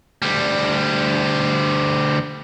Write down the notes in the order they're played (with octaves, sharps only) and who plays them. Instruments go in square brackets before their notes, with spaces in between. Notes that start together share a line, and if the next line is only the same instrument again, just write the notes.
[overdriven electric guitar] D2 G3